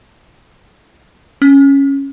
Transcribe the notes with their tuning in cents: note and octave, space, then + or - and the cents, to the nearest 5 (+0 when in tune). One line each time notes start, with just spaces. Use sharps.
C#4 -5